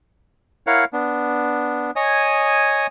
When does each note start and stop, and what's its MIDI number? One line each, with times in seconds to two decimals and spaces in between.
0.67 0.85 64
0.67 0.85 70
0.67 0.85 73
0.67 0.85 77
0.67 0.85 78
0.93 1.91 59
0.93 1.91 62
1.96 2.87 73
1.96 2.87 75
1.96 2.87 80
1.96 2.87 87